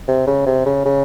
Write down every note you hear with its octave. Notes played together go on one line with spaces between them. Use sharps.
C3
C#3
C3
C#3
C#3